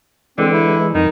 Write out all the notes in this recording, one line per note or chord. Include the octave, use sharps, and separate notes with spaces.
D3 E3 G#3 C4
E4
F2 D#3 D#4